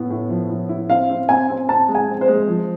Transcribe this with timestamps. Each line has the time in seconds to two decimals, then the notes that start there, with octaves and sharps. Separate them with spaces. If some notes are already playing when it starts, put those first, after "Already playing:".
Already playing: A2 B3 E4
0.10 A2
0.30 F3
0.50 A2
0.69 E4
0.89 C4 F5
1.10 C4
1.29 C4 G#5
1.49 C4
1.68 C4 A5
1.88 G#3
1.95 G#5
2.08 C4
2.21 C5
2.28 G#3
2.47 F3